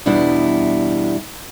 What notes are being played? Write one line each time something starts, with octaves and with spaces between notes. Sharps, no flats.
E2 B2 G3 D4 E4